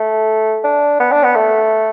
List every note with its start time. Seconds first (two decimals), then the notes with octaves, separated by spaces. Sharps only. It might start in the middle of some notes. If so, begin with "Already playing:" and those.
Already playing: A3
0.64 D4
1.00 B3
1.12 D4
1.24 B3
1.35 A3